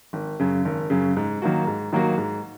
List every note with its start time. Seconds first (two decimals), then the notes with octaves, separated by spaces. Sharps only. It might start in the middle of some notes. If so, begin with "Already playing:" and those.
0.13 G#1
0.40 F#2 C#3
0.65 G#1
0.90 F#2 C#3
1.17 G#2
1.42 D#3 F#3 A#3 F#4
1.67 G#2
1.93 D#3 F#3 A#3 F#4
2.18 G#2